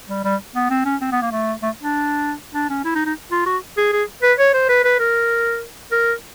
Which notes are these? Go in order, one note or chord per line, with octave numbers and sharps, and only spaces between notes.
G3
G3
B3
C4
C#4
C4
B3
A#3
A3
A3
D4
D4
C#4
E4
D#4
D#4
F4
F#4
G#4
G#4
B4
C#5
C5
B4
B4
A#4
A#4